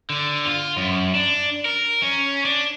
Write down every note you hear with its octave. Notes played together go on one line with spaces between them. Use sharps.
D3
F4
F#2
D4
A#4
C#4
D4